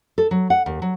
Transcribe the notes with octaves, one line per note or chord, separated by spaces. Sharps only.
A4
F#3
F#5
D#2
F#3